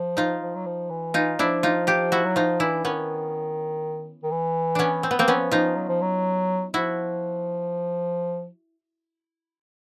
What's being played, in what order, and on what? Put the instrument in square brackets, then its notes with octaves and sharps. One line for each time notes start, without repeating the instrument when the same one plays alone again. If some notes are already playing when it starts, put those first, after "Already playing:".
Already playing: [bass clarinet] F3
[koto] D#4 F4
[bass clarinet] F3
F#3
F3
E3
[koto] D#4 F4
[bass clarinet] F3 [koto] D4 E4
[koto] D#4 F4
F4 G4
E4 F#4
[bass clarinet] F#3
[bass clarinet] F3 [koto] D#4 F4
[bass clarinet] E3 [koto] D4 E4
[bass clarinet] D#3 [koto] B3 C#4
[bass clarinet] D#3
E3
[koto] B3 C#4 D4
C4
B3
A#3 C4
[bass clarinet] F3 [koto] B3 C#4
[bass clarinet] F3 [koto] D#4 F4
[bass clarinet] F#3
F3
F#3
[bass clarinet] F3 [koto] E4 F#4